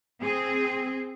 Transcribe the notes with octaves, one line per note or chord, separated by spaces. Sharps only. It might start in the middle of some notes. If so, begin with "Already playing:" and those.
C4 G#4